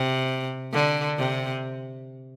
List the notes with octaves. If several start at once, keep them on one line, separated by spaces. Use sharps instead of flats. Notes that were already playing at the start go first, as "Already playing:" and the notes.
Already playing: C3
D3
C3